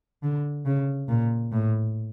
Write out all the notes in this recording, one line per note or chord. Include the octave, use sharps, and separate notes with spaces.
D3
C#3
A#2
A2